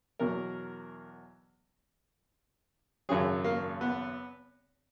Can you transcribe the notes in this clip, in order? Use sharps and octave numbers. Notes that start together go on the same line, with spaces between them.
E2 B2 F#3 A#4
G#1 F#2 C#3 F#3 G#4
A#3
B3